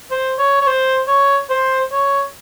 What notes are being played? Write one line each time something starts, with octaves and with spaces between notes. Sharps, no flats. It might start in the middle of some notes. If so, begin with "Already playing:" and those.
C5
C#5
C#5
C5
C#5
C5
C#5